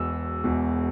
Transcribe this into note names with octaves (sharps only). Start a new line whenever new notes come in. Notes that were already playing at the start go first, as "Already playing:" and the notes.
Already playing: E1 E2 B2 E6
E1 E2 B2